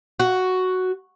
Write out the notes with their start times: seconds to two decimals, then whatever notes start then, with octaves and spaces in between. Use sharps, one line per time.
0.20 F#4